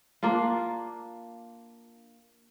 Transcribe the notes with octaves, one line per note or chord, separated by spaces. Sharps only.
A#3 D4 F4